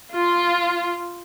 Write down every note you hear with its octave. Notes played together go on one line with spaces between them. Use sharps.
F4